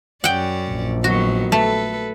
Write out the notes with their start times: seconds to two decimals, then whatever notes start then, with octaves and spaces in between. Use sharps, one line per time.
0.24 F#2 C#4 D5 F#5 G5
0.70 A#1
1.04 D#3 F#3 B3 F#4
1.52 A3 A4 B4